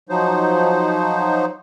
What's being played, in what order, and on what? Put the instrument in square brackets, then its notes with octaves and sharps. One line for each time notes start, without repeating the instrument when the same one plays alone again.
[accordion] F3 F#3 D#4 C5